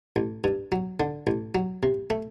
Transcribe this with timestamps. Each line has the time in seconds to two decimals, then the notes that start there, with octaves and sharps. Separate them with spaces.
0.16 A1
0.44 G2
0.72 F#3
1.00 D3
1.27 A1
1.55 F#3
1.83 C3
2.10 A3